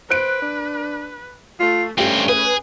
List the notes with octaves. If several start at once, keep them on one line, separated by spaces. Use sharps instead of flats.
B4 C5 F#6 D7
D4
A3 F4
G2 A3 C4 C#4 G4
G#4 B4